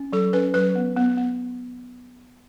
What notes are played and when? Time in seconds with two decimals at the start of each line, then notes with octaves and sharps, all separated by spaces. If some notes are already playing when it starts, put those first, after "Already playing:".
Already playing: C#4
0.13 F#3 A4
0.33 C#4 B4
0.54 F#3 B4
0.75 B3
0.97 B3
1.17 B3